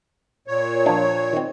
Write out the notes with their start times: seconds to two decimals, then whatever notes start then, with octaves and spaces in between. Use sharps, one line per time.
0.48 A#2 C#5
0.86 F3 D4
1.33 D#3 C4